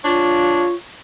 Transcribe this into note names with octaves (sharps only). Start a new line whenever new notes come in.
D4 F4 C#5